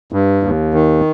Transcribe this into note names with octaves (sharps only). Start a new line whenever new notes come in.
G2
D#2
D#3